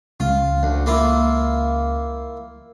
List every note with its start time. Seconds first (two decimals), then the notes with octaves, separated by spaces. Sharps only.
0.20 C#2 F4
0.63 D2
0.86 A#3 E4 F4